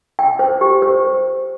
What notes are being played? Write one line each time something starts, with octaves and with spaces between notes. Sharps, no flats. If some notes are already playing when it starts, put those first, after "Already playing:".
G5
C5
G4
C5